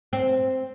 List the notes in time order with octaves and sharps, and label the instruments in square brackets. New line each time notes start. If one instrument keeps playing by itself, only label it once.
[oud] C4